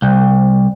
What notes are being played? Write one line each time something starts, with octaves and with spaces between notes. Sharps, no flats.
C2